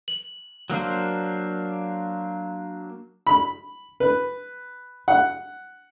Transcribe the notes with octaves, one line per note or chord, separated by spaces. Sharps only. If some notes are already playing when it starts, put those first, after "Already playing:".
F#7
F#3 A#3 D4 C5
B5
B4
F#5